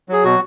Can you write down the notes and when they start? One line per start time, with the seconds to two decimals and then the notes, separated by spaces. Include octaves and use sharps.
0.09 F#3 G#4
0.24 B2 F#4